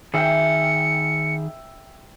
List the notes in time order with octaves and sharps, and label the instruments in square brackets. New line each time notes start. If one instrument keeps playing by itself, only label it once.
[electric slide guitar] D#3 G#4 [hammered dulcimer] E5 G5 [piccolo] C#7